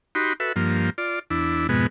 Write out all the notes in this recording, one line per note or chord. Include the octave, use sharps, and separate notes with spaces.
D#4 F#4 G4 B5 C6
F#4 A4 B4 E5
G2 F3 A#3
F4 D5
E2 D4 E4
F2 G#2 B2 G#3 B3